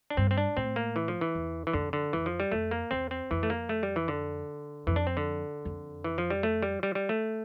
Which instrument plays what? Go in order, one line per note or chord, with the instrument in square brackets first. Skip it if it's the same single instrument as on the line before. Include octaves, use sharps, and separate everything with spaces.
[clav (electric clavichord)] D4
[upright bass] G2 [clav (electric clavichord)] C4
[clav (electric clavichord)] C4
D4
[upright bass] A2 [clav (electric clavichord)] C4
[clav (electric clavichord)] A#3
E3
F3
E3
[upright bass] E2
[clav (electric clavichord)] E3
[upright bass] F2 [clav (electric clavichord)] D3
[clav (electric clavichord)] D3
[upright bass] F2 [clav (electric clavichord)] E3
[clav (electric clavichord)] F3
G3
[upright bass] F2 [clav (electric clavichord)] A3
[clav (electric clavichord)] A#3
[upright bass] E2 [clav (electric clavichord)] C4
[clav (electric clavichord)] C4
[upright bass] F2 [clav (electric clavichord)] E3
[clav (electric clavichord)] A3
A#3
A3
G3
E3
D3
[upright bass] F2 [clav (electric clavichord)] E3
[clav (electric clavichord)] D4
C4
D3
[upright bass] F2
[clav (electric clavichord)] E3
F3
G3
A3
G3
G3
G3
A3